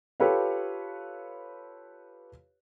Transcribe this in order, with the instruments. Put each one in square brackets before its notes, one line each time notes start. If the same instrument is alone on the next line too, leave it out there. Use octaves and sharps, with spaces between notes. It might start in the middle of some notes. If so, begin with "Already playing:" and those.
[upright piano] F4 G4 A4 B4 C#5 F5